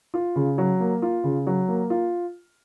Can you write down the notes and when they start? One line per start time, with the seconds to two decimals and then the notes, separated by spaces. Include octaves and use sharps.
0.14 F4
0.36 C#3
0.58 F#3
0.80 A#3
1.02 F4
1.24 C#3
1.47 F#3
1.68 A#3
1.90 F4